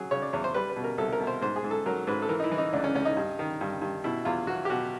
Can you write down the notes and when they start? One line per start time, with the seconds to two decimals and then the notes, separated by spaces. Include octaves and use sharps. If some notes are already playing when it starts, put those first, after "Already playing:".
Already playing: F#3 G#4
0.11 C#3 C#5
0.22 D5
0.33 E2 C#5
0.44 C5
0.54 G3 B4
0.69 B4
0.76 B2
0.84 A#4
0.98 C2 A4
1.12 A#4
1.20 B2
1.27 C5
1.41 G#2 C5
1.56 G#4
1.64 G#2
1.71 A4
1.86 F#3 A#4
2.07 G#2 B4
2.22 A4
2.29 E3 A#4
2.40 D#4
2.44 E4
2.51 E3
2.58 D#4
2.73 C#2 D4
2.84 C#4
2.95 C#2 C#4
3.05 D#4
3.17 G2
3.39 D#3
3.61 G2
3.81 G2
4.04 B2 E4
4.25 E2 F4
4.47 E2 F#4
4.65 G4
4.70 B2 F#4